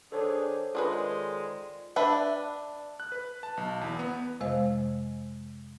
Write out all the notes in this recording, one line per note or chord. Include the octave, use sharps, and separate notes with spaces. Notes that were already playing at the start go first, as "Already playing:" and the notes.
D#3 D4 G#4 A4 C5 C#5
D#3 G#3 D4 F4 G#4 B4 D5 C6
D4 B4 E5
F#6
B4
A5
B1
E2
B3
F2 C3 G#3 C5 D#5 F5